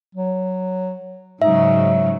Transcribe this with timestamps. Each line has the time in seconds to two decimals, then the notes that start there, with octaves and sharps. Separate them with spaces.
0.15 F#3
1.42 G#2 C#3 F#3 D#4 E5